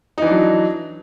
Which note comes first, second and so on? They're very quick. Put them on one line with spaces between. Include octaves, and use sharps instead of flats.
D#4 E3 D4 F#3